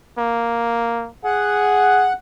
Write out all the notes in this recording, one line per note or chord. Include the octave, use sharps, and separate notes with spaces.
A#3
G#4 F#5